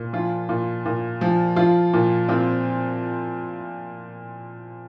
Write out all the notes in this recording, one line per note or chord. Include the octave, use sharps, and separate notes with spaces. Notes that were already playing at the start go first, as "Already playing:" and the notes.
Already playing: A#2
F3 F4
A#2
A#2
F3
F3 F4
A#2
A#2 C4